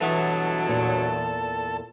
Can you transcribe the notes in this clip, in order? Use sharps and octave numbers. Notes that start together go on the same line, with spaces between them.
G2 B2 E3 F#3 B3 E4 A4
E2 A#2